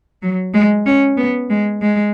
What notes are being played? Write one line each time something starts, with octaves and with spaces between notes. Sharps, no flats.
F#3
G#3
C#4
B3
G#3
G#3